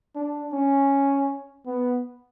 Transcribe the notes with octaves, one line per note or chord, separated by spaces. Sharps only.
D4
C#4
B3